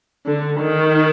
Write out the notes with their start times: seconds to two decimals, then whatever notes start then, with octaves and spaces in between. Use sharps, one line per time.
0.26 D3
0.60 D#3